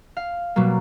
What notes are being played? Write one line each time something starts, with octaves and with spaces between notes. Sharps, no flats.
F5
B2 F#3 G3 A#3